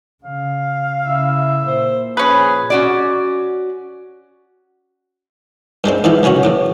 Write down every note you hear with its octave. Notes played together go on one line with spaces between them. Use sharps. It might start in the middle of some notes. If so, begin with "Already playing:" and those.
C#3 F5
C#3 E4 E5
A#2 C5
F3 C#4 G#4 B4
C#4 F#4 D5
G2 G3 G#3 C4
G#2 E3 E4 F4
B1 C#3 C#4 F#4 C#5
E2 A2 D6